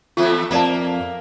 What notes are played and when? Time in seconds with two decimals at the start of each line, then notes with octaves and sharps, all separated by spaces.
0.17 E2 A3 F4
0.51 F2 A#3 D5 A5